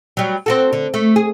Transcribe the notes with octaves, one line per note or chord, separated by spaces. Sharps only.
F#3 G3
C4 F#4 A4
D3
A3
G#4